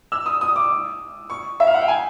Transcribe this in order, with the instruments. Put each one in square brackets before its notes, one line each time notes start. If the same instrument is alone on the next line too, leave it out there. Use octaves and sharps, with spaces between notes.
[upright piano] E6
D#6
D#6
D6
C#6
E5
F5
F#5
G5
G#5